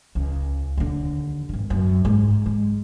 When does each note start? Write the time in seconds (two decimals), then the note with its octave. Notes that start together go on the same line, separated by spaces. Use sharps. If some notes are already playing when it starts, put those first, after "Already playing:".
0.15 C#2
0.77 D#2 D3
1.49 G#1 G2
1.70 F#2
2.05 G#2
2.46 G#3